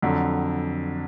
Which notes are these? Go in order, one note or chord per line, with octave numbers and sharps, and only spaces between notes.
F2 D3 F#3